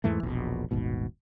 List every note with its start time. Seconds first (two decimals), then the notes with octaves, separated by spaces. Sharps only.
0.04 E2 G#2 E3 A3
0.23 E1 A#1 B2
0.71 D#1 G#1 G#2 B2